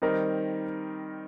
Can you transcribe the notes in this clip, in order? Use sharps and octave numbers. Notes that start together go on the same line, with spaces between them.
D#3 G3 C4 D#4 A#4